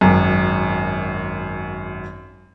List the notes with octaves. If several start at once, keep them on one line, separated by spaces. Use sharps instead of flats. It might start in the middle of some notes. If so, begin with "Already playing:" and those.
G#1 F#2